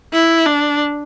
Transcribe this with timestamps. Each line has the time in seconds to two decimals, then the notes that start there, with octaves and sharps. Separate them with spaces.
0.13 E4
0.46 D4